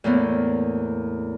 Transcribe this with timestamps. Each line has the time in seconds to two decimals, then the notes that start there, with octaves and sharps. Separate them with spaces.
0.04 E2 A2 A#3 B3